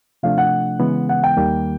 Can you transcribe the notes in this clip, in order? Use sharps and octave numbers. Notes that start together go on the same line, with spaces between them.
C3 F3 A3 D4 F5
F#5
C#3 E3 G#3 B3
F#5
G5
D#2 D#3 G3 A#3